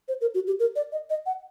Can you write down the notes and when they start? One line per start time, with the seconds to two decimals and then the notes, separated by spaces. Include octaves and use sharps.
0.08 C5
0.21 A#4
0.34 F#4
0.47 G4
0.60 A#4
0.76 D5
0.92 D#5
1.10 D#5
1.26 F#5